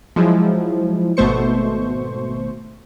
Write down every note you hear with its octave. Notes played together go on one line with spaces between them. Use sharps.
F3 F#3 G#3 E4
G#1 B2 A3 C5 C#6